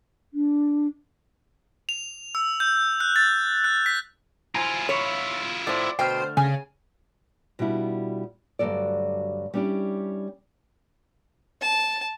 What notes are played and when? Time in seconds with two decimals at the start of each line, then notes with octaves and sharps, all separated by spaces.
0.34 D4
1.89 F7
2.35 E6
2.60 G6
3.00 F#6
3.16 A6
3.64 F#6
3.86 B6
4.55 E4 F4 C5 G#5 A#5
4.89 C#5 B5
5.67 A2 C5 D5
5.99 B2 D3 A3 C5 G5 F6
6.37 C#3 G#5
7.59 B2 G3 D4 E4 F4
8.59 D2 G2 E3 F#3 A4 D5
9.54 G3 C#4 D4 E4 G4
11.61 A5